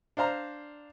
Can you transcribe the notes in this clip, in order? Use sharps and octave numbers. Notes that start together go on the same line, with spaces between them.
D4 C5 F5 A#5